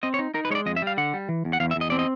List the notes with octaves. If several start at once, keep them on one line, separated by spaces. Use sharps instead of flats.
C4 D#5
C#5
D#4
D#4 A#4
B4
G#3 C#5 D5
F2 D#5
E5
G3 F5
D3 F#5
G3
E3
E2
F#5
E2 F5
E5
E2
D#5
C4 D5
D#5